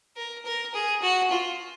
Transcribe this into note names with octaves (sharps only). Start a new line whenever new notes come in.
A#4
A#4
G#4
F#4
F4